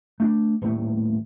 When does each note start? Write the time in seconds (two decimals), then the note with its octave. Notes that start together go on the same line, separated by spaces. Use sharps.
0.20 A3 C#4 D4
0.61 D#1 A2 A3